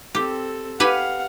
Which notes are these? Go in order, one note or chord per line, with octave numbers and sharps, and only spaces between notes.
C4 G4 A4
G4 B4 F5 F#5 G#5